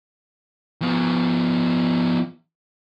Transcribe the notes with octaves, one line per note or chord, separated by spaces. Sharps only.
F3 B3